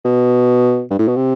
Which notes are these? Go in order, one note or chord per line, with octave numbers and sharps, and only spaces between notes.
B2
G2
A2
B2
C3